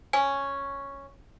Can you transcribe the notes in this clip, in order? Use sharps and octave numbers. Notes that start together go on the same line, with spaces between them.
C#4 G#5